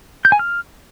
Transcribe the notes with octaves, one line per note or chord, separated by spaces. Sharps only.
G6
G#5
F6